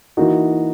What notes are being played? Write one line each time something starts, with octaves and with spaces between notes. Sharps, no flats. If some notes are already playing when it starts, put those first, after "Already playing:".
E3 A#3 D#4 F#4